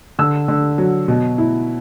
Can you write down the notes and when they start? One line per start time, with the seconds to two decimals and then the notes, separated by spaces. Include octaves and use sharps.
0.19 D3 E6
0.48 D3
0.78 F#3
1.08 B2
1.38 E4